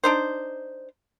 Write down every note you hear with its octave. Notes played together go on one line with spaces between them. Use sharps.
D4 D#4 C5